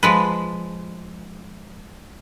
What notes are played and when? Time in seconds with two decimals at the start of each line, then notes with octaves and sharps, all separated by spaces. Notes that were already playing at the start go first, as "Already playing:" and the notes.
0.03 F3 G#3 B4